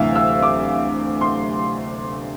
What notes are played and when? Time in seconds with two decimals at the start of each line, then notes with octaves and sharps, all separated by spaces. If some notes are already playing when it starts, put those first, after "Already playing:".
Already playing: D2 C3 E3 E5 F5
0.15 E6
0.43 D6
1.21 C6